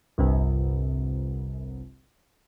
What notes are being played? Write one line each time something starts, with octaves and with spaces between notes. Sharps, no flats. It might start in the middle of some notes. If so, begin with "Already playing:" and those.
G1 C2 C3